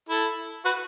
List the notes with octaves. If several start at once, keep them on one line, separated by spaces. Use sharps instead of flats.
E4 A4
F#4 B4